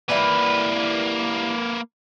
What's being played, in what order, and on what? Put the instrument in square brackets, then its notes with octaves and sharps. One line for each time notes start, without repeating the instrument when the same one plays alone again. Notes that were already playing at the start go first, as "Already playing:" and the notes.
[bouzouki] E3 G3 E4 [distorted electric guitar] A#3 B4